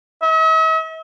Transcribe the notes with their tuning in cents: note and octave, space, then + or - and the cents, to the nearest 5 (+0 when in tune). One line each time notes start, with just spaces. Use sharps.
E5 -45